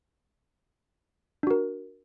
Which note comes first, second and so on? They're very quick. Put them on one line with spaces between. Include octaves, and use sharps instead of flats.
D4 F#4 A#4